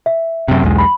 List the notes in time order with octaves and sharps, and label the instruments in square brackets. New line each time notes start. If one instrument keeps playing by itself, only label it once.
[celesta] E5
[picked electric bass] F#2 C3
B1 E2 G#3
[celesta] B5